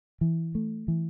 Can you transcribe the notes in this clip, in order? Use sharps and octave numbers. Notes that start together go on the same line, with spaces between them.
E3
A3
E3